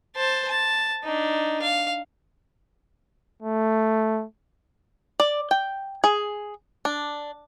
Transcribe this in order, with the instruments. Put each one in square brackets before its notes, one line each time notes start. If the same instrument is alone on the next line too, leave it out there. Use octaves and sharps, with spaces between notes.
[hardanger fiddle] C5 A5
A5
D4 D#4
F5
[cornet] A3
[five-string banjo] D5
G5
G#4
D4